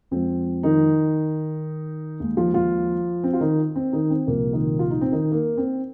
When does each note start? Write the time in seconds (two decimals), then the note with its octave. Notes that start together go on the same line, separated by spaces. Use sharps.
0.11 F2 F3 G#3 C4
0.63 D#3 D#4
2.20 D#2 D#3 G#3
2.37 F3 F4
2.54 F3 F4
3.24 C4
3.33 F4
3.40 D#3 D#4
3.76 C4
3.93 D#3 D#4
4.10 C4
4.27 C2 A#2 F3 A#3
4.53 D#3 D#4
4.79 F4
4.90 D#4
5.01 C4
5.12 D#3 D#4
5.32 A#3
5.57 C4